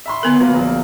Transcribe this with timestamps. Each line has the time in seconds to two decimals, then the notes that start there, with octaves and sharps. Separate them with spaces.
0.06 E5 B5 C6
0.23 D3 B3 A#4
0.40 F#3 A#3 B4
0.55 A#1 A#3